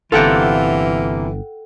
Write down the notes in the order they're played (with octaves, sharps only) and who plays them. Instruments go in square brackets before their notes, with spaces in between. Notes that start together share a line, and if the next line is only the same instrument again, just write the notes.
[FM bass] G1 [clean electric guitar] C3 A#3 F4 [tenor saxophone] E3 [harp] A4 F#5 G5